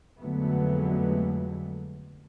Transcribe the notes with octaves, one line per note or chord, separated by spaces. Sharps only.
F2 D3 F#3 G#3 A3 B3